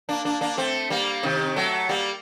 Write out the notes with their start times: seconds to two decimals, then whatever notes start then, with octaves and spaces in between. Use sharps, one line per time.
0.09 A#3 D4
0.25 A#3 D4
0.41 A#3 D4
0.58 A3 C4
0.90 G3 A#3
1.23 C3 D#3
1.56 F#3 A3
1.89 G3 A#3